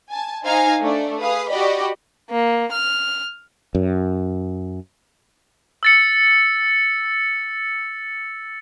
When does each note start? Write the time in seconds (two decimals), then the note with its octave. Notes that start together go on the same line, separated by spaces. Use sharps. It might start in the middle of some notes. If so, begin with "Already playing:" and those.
0.10 G#5 A5
0.45 D#4 C5 F5 G#5 A#5
0.80 A3 D4 D5
1.20 G#4 B4 F5 D#6
1.50 F#4 G4 D5 D#5 B5
2.30 A#3
2.72 F6
3.75 F#2
5.83 E6 A6 C#7